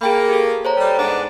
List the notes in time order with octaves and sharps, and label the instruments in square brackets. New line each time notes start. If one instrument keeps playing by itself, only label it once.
[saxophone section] A#3 [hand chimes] G#4 G5 B5
[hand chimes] G4 A4
C5 C#5 A#5
[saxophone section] G3 [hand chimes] A4
[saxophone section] G#2 B3 D4